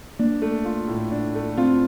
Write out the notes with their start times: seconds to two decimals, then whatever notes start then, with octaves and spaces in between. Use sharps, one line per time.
0.19 A#3 D4
0.42 A3
0.65 F4
0.88 A2
1.12 D4
1.35 A3
1.57 C4 F4